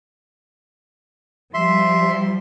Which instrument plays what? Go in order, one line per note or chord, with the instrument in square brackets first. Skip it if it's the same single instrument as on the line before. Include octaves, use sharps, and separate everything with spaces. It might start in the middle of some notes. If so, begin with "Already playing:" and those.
[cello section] F3 G3 [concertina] E5 C6